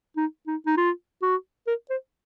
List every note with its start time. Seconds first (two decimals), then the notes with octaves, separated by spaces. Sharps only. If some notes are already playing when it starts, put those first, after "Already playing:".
0.17 D#4
0.47 D#4
0.66 D#4
0.77 F4
1.22 F#4
1.67 A#4
1.90 C5